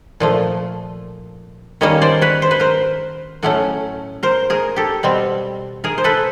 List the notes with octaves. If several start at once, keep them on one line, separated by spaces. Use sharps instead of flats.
A#2 F3 A3
D#3 G3 A#3 C#4 C#5 D#5
C5 D5
B4 C#5
C5
B4
A#4 C5
A2 F#3 A3 C#4
A#4 C5
G#4 A#4
G4 A4
B2 G3 C4
G#4 A#4
C5
A4 B4